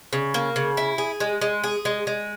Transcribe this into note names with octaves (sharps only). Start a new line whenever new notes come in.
C#3
A#3
C#3
E4
G#4
G#3
G#3
G#4
G#3
G#3